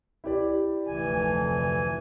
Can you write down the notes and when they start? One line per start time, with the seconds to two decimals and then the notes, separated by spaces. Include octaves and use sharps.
0.24 E4 G4 D5
0.87 F1 D2 E3 A3 G#5